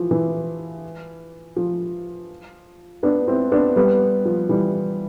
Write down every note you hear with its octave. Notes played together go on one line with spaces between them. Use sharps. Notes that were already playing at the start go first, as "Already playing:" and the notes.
Already playing: E3 F3
E3
F3
B3 D4
C4 E4
B3 D4
G3 B3
F3
E3 G3